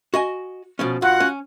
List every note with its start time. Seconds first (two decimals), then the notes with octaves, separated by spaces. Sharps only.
0.14 F#4 D#5 G#5
0.79 B2 F3 C#4
1.02 G2 F4 F#4 F#5
1.20 C#4